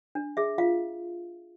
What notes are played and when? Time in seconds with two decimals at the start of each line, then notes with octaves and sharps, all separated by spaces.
0.15 D4
0.37 G#4 E5
0.58 F4 F5